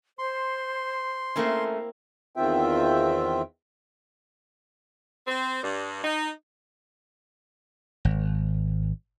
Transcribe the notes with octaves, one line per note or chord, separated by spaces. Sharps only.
C5 C6
A3 A#3 C4 C#4 E4
E2 D#3 C4 F4 E5 G5
C4
G2
D#4
G#1